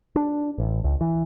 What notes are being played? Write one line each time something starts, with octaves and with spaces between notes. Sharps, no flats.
D4
A1
C#2
E3